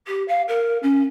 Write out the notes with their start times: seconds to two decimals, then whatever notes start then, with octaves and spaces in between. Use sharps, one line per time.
0.06 G4
0.28 F5
0.48 A#4
0.82 C#4